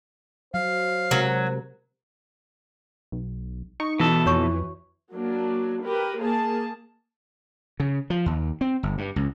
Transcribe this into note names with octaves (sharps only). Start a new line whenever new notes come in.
F#3 C5 F5
C3 F#3 G#3 A#4
B1
D#4 C#6
B2 E3 A4
F2 F#4 C#5 C#6
F#3 A#3 D4
G4 A#4 B4
A#3 G#4 A5
C#3
F3
D#2
C4
G1
G2
C#2